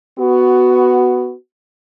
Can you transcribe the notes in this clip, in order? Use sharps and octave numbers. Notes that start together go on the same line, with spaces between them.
B3 F#4